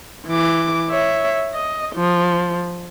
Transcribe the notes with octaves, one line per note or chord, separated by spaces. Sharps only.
E3 D6
C#5 E5
D#5
F3